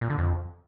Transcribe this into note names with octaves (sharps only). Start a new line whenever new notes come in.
A#2
D3
F2